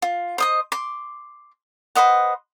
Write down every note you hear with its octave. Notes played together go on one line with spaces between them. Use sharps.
F4
C5 D#5 D#6
C6 D6
B4 C5 D#5 F#5